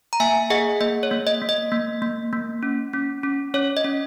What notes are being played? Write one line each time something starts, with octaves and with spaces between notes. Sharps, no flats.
A#5
A#3 E5 G#5
G#4 D#5 F#5
A#3 D#5
C#5
A#3
D#5
A#3
D#5
A#3
A#3
A#3
C#4
C#4
C#4
C#4 C#5
D#5
C#4